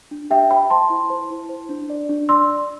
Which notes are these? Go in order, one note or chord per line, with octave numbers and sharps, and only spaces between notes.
D4
G4 E5 G5
C5 G5 B5
C5 A5 C6
E4
C5
E4
C5
D4
D5
D4
D5 C6 E6